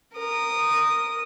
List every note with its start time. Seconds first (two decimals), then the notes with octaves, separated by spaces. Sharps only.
0.14 A#4 D#6